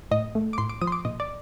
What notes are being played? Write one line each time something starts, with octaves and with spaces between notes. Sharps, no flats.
A2 D#5
A3
D6
A2 C6
D6
F3 D#6
C6
D6
A#2 D#5
D5